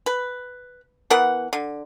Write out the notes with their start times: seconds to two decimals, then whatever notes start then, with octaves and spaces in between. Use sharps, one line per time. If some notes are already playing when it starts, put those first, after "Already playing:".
0.06 B4
1.10 E3 B3 A#4 F#5
1.53 D3